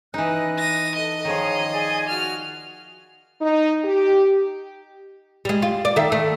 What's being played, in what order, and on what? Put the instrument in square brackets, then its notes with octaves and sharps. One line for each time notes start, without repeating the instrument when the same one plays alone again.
[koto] E3 D#4 [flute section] D#5 F#6
[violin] A#6 D#7
[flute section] A4 [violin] D#5
[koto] D#3 F3 [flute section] G#4 C#5 A#5
[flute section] G#4 D5 G#5
[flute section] F#4 [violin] F6
[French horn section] D#4
G4
[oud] G3 G#3
F4
D5
D#3 A4 E5
A3